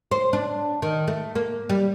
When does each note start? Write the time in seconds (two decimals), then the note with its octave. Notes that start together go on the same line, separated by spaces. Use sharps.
0.11 C5
0.33 D4
0.82 D#3
1.08 A3
1.35 A#3
1.69 G3